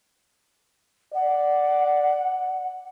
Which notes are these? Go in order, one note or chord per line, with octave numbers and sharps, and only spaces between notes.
D5 F#5